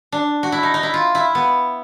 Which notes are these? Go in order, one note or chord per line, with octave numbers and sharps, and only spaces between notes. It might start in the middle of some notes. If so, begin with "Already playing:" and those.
D4
F#4
E4
D#4
D#4
E4
F4
E4
B3